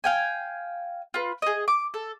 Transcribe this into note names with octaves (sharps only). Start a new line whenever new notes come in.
F5 G5 G#5
F4 B4
G#4 D#5
D6
A4